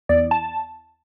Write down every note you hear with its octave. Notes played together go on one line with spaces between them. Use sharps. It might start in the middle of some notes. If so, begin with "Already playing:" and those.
E2 D5
A5